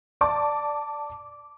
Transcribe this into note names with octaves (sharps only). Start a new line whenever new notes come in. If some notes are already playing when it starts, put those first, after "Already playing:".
D5 A5 D6